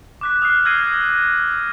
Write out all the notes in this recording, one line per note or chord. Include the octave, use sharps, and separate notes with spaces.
D6 F#6 B6
D#6 F6 F#6 C7
E6 F6 G#6 A#6 C7 D#7